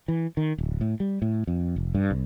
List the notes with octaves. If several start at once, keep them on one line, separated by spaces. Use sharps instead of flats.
E3
D#3
D1
A2
G3
A2
F2
F1
G2
C2